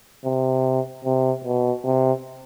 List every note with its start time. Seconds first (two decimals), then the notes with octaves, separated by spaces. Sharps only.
0.25 C3
1.05 C3
1.44 B2
1.84 C3